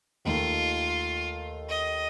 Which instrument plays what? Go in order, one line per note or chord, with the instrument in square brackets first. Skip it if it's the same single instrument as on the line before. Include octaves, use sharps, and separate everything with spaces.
[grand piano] D#2 D#3 A3 D#4 [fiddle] F4
[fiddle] D#5